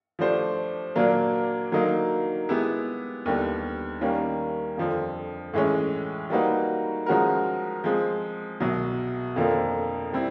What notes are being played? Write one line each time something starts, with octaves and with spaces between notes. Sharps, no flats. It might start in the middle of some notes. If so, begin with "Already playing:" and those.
F3 A3 D4 G4 C5
A#2 F#3 A#3 D4
D3 F#3 A#3 D#4
G#3 B3 E4 G4
D#2 D3 G3 B3
D#3 G3 A#3 C#4
F2 D3 F3
A2 E3 G#3 C#4
G3 A#3 D#4 F#4 B4
F3 G#3 C#4 F#4 A#4
F3 G#3 C4
C2 B2 F#3
F2 D3 F3 A#3
G3 C4 E4